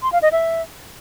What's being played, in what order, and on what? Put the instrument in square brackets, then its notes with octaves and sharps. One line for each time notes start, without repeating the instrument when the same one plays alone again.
[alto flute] C6
F5
D#5
E5